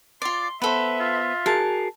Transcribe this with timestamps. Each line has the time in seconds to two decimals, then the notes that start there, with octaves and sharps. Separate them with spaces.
0.22 F4 D5 C6
0.62 B3 A4 B4 C5 E5
1.00 F4
1.46 F#4 G#4 A#4 A5